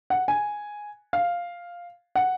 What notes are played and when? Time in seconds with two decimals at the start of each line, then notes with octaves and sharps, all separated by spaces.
0.10 F#5
0.28 G#5
1.13 F5
2.15 F#5